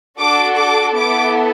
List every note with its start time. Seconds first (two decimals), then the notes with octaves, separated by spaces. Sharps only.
0.19 D4 F#4 A4 D6
0.58 D6
0.96 B3 E4 A4 D6